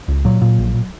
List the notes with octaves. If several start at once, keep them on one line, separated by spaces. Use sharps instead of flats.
C#2
A#2 F#3
A#2
A#1